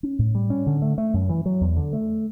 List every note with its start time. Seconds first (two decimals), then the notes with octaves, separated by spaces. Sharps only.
0.03 C#4
0.19 A2
0.35 G3
0.50 C#4
0.66 D3
0.82 A3
0.98 A3
1.14 F#2
1.29 E3
1.46 F#3
1.61 E2
1.77 D3
1.93 A3